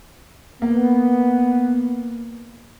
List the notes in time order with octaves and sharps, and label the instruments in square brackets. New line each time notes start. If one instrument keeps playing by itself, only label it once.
[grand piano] A#3 [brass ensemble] B3